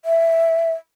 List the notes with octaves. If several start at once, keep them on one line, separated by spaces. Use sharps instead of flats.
E5